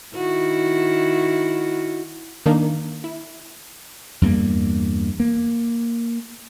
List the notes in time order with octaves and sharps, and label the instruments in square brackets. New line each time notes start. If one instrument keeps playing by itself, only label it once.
[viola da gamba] D#3 E4 F#4
[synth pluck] D#3 A#3 D4 D#4
E4
[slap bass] E2 G2 G3 A#3
A#3